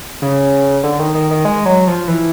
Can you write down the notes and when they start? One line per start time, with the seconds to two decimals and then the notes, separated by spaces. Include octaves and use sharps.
0.22 C#3
0.83 D3
0.99 D#3
1.15 D#3
1.31 D#3
1.45 G#3
1.66 F#3
1.87 F3
2.08 E3